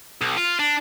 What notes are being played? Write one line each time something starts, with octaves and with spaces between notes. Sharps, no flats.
B1
F4
D4